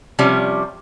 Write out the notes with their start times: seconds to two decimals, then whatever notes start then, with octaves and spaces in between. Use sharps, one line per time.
0.19 C3 F3 G3 C#4